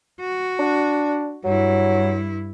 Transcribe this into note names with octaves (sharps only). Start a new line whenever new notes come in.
F#4
D4
G2 F#3 E4